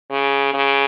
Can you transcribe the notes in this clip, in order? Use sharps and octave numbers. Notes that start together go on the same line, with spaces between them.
C#3
C#3